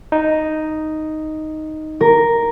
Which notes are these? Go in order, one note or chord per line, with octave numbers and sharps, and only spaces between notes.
D#4
A#4